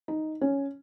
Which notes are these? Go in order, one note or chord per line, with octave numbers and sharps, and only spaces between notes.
D#4
C#4